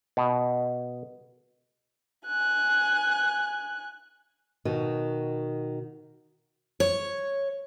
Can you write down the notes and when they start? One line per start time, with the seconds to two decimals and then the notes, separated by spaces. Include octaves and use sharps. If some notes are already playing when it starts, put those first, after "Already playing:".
0.17 B2
2.26 G#5 F#6
4.65 B2 D#3 F#4 D#7
6.80 C#5